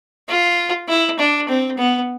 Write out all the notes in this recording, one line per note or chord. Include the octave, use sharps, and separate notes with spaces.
F4
E4
D4
C4
B3